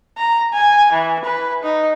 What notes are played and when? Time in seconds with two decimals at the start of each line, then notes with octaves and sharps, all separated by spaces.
0.17 A#5
0.53 G#5
0.93 E3
1.25 B4
1.63 D#4